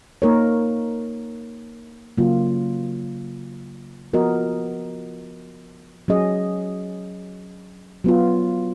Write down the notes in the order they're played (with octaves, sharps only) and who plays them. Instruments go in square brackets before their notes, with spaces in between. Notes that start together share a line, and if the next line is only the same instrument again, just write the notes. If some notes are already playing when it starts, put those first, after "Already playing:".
[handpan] A#3 D#4 A#4 C#5
C#3 F#3 A#3 F4
F3 B3 F#4 A#4 D#5
F#3 C#4 G#4 D#5
F#3 B3 F4